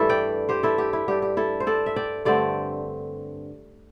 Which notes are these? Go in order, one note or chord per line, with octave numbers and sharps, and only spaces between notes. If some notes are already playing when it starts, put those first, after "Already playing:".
Already playing: G2 E3 A3 E4 A4
D5 G5
G4 C5
E4 A4
G4
E4
G2 G3 D4 G4
G4
E4 A4
C5
A4 D5
E5
D5 G5
G2 D3 A3 C4 D5 G5